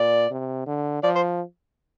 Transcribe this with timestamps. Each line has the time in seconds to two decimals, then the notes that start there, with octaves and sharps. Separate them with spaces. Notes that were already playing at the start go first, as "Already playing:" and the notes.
Already playing: A#2 D5
0.31 C3
0.67 D3
1.03 F3 D5
1.15 C5